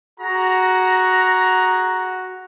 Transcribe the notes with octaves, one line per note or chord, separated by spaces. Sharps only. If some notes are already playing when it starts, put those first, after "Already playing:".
F#4 G#4 A#5